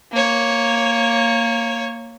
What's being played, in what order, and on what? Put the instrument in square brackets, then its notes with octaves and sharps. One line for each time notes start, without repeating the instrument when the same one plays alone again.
[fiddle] A#3 C#5